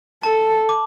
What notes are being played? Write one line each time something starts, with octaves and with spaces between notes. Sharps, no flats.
A4 A5
D6